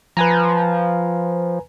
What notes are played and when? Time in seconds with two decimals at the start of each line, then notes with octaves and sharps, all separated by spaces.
0.17 F3 B4 G#5 A#5